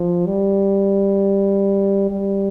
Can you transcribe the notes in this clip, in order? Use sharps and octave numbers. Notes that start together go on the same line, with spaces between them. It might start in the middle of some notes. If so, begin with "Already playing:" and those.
Already playing: F3
G3
G3